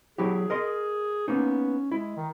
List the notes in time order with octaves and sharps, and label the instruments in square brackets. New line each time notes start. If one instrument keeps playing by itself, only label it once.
[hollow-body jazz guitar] F#3 E4 G4 [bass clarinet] G#4
[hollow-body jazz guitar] A#4 D#5 C6
[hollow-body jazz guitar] A#3 B3 D#4 [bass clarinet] C#4
[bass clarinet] G#3 [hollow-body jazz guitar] E4
[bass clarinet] D#3